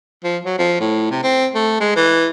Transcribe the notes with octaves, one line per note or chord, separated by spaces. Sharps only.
F3
F#3
F3
A2
C3
C4
A3
G#3
E3